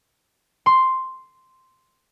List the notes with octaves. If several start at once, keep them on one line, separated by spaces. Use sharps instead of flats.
C6